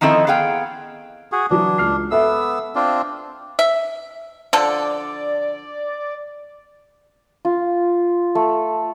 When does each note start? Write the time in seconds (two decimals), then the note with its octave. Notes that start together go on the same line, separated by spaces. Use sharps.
0.01 D#3 F3 C4 E4 A4 D#5
0.27 B3 G#4 F5 G5
1.32 F#4 G#4
1.50 E3 F#3 D4 F#4
1.78 C#2 F6 C7
2.11 B3 A4 E5 E6
2.75 C4 D4 F4
3.59 E5
4.53 D3 F3 A4 D5
7.45 F4
8.35 A3